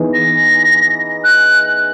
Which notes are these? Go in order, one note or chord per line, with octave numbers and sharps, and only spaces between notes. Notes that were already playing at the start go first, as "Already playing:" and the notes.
Already playing: E3 B3 D#4 G#4
A#6
F#6